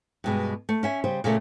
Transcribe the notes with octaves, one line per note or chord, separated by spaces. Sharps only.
G2 B2 G#3
A3
C#4 E5 G#5
C#3 G3 C5
A#2 C#3 A3 A#3